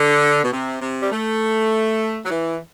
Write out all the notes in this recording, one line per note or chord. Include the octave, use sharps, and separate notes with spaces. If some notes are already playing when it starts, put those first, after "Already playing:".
Already playing: D3
B2
C3
C3
G3
A3
F#3
E3